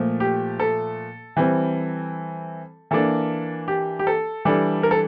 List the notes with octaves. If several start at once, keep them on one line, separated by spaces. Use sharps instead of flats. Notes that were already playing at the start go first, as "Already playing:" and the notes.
Already playing: A#2 F3 A3
G4
A4
E3 G3 C4
E3 A#3 D4 A4
G4
G4
A4
E3 G3 D4 A4
A#4
A4